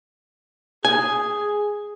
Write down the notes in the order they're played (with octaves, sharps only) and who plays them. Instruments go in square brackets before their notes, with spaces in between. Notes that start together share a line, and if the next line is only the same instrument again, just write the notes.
[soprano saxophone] G#4 [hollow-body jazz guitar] G#5